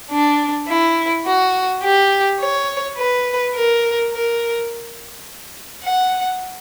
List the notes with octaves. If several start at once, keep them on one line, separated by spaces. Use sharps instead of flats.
D4
E4
F#4
G4
C#5
B4
A#4
A#4
F#5